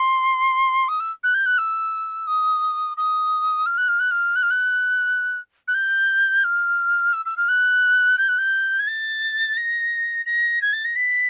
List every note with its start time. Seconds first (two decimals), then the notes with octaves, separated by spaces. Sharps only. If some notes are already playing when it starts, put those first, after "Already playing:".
Already playing: C6
0.89 D#6
1.00 E6
1.24 F#6
1.34 G6
1.46 F#6
1.58 E6
2.27 D#6
2.97 D#6
3.66 F6
3.78 F#6
3.89 F6
4.00 F#6
4.11 F6
4.36 F#6
4.43 F6
4.51 F#6
5.68 F#6
5.74 G6
6.44 F6
7.13 E6
7.26 E6
7.37 F6
7.49 F#6
8.18 G6
8.29 F#6
8.38 G6
8.79 G#6
8.87 A6
9.57 A#6
10.26 A#6
10.62 G#6
10.73 A6
10.85 A#6
10.96 B6